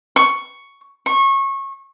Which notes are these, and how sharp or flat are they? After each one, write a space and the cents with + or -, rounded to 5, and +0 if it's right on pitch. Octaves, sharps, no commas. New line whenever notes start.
C#6 +5
C#6 -25